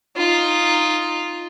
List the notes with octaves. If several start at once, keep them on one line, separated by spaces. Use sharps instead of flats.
D#4 F4